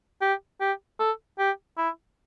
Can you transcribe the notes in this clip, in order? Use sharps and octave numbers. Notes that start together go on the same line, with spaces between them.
G4
G4
A4
G4
E4